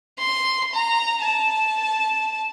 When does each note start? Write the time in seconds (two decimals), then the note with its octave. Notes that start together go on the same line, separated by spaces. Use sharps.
0.19 C6
0.74 A#5
1.22 A5